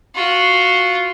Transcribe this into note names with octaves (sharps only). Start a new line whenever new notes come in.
F4 F#4